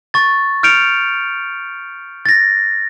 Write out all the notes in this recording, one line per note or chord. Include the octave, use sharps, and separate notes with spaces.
C#6 A6
F6 G6 C#7 D7 F7
A6 A#6